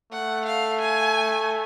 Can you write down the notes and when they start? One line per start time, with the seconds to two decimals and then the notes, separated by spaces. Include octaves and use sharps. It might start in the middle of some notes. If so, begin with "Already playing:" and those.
0.12 A3 F#5
0.46 F5
0.81 G#5